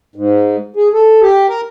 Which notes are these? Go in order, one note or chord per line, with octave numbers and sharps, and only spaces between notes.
G#2
G#4
A4
G4
A#4